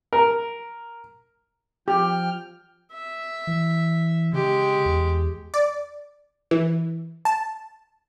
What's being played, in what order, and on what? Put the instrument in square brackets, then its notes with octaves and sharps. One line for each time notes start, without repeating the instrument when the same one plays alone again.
[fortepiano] A#4
[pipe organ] F3 G5 F6 [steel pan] G4
[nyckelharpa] E5
[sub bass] E3
[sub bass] C#3 [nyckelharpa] G#3 G4
[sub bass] E2
[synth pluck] D5
E3
A5